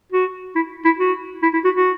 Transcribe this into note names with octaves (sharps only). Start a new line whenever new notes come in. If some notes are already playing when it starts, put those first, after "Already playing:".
F#4
E4
E4
F#4
E4
E4
F#4
F#4